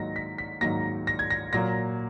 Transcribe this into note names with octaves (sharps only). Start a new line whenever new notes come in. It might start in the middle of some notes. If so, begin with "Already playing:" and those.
Already playing: G#2 D#3 F#3 A#3 A#6
B6
B6
G#2 D#3 F#3 A#3 A#6
A#6
G#6
A#6
A#2 F#3 A#3 A#6